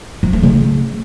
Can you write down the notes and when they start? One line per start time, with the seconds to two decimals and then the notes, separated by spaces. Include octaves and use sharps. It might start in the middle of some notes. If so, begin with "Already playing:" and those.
0.23 F3
0.33 A3
0.43 C#3